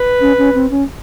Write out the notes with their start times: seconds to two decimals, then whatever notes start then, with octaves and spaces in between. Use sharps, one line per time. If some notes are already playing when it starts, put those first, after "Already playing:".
Already playing: B4
0.21 C#4
0.38 C#4
0.55 C4
0.71 C#4